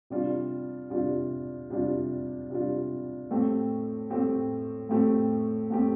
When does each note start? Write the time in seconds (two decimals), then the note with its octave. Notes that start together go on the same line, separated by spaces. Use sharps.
0.10 C3 G3 D4 F4
0.90 C3 G3 D4 F4
1.70 C3 G3 D4 F4
2.50 C3 G3 D4 F4
3.31 A2 A3 C4 G4
4.10 A2 A3 C4 G4
4.89 A2 A3 C4 G4
5.70 A2 A3 C4 G4